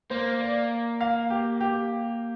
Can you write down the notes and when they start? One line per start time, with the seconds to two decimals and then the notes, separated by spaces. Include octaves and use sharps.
0.10 A#3 C5
0.40 D5
1.01 F5
1.30 G4
1.61 G4